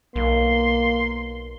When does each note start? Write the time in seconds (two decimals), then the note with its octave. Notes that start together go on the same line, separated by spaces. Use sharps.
0.16 B1 A#3 C6